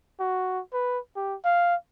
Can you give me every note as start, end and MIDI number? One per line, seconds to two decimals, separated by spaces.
0.20 0.60 66
0.73 0.99 71
1.16 1.35 67
1.44 1.75 77